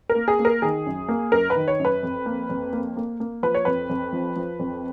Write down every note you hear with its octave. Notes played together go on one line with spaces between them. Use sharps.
A#4
A#3
G#4
A#3
A#4
D#3 G#4
F#2
A#3
F#2 A#4
B4
D#3
C#5
F#2
B4
F2
A#3
F2
A#3
A#3
A#3
F3 B4
C#5
F2 B4
F2
F3
F3
F2